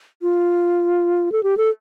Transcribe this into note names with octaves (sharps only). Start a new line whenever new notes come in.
F4
A4
G4
A4